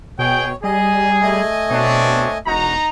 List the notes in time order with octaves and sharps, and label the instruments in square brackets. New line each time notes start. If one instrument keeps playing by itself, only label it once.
[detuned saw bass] B2 [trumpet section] G#4 G5 [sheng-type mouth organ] C#5
[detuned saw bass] G3 [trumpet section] G#4 [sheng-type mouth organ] D#5
[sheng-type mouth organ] A3 D#5 G#5
[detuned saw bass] B2 [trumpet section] C4 D4 C#5
[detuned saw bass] E1 [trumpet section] D#4 A#5 [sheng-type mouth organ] F#4